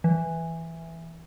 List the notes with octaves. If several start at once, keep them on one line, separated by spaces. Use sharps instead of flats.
E3